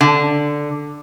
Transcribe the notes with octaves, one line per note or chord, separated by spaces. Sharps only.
D3